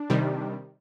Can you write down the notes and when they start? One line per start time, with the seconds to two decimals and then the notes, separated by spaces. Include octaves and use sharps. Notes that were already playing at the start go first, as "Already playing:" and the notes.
Already playing: D4
0.10 C3 D#3 G3